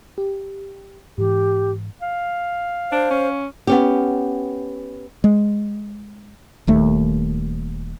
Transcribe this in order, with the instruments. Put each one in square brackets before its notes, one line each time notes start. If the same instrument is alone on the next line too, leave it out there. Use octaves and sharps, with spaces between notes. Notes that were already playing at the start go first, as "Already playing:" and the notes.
[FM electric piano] G4
[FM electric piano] G#2 E3 [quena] G4
[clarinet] F5
[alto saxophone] D4 [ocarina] C5
[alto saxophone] C#4
[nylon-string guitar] B3 C#4 G4
[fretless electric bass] G#3
D#1 D#2 A3